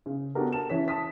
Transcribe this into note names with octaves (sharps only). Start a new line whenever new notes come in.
C#3
B3 D4 F#4 G4 A4 A#4
A#4 A5 E7
E3 C#4 B6
A5 D#6 B6